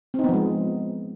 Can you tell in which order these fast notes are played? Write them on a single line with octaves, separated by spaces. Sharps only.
C4 D#4 B3 F3 G#3